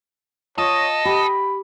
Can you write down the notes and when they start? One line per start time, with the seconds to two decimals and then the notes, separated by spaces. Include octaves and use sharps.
0.58 F4 A4 C#5 D#5
1.05 G4 B5